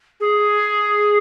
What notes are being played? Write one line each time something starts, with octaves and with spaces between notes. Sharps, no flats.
G#4